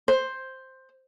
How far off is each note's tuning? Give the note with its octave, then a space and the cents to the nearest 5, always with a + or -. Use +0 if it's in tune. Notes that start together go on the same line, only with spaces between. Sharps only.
C5 +5